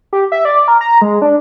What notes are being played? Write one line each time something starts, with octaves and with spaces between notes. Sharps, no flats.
G4
E5
D5
A#4
A#5
G#3
D4